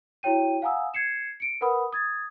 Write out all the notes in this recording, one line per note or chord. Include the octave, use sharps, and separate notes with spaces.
E4 F#4 C#5 G5 D#7
F5 F#5 G#5 A#5 D#6 E6
G#6 C7 C#7 E7
C#7 D7
A#4 B4 F#5 B5 D#6
D#6 G#6 A6